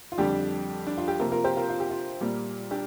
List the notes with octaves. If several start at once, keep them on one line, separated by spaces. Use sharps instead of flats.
F4
F2 D3 G3 D4 G4
D4
F4
G4
C3 F3 A#3 F4 A#4
F4 A#4
G4 C5
F4 A#4
F4
G4
F4
A#2 G3 A#3
D4 G4